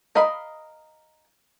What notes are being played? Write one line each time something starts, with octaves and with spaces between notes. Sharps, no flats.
A#4 D#5 F5 B5